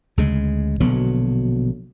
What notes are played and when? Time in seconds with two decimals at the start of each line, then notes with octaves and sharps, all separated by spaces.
0.17 D2 C#3 G#3
0.80 A#1 B2 D3 F#3